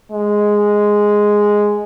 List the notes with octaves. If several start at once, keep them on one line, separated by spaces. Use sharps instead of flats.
G#3